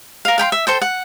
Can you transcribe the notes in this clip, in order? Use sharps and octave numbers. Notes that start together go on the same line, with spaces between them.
A#4 F5
F5 G5 B5 C6
E5
A4 C5 G5
F#5